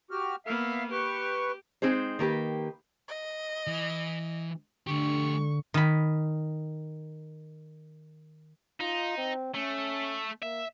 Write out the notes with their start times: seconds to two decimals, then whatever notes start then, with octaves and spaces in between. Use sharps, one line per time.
0.11 F#4 G4 F6
0.46 A#3 B3 E5 F5
0.92 G4 B4 C#6
1.82 G#3 C4 D#4 G#4 C5
2.19 D#3 A#3 G4 B4
3.08 D#5
3.67 E3
4.87 D3 A3 G4 C#6
5.74 D#3 B5
8.80 D#4 F4
9.17 C4
9.54 A3 C#4
10.42 A#3 E5